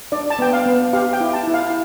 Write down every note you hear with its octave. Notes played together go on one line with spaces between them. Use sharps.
D4 D5
A5
B3 G5
F5
B3
G4 F5
G5
E4
A5
E4
F5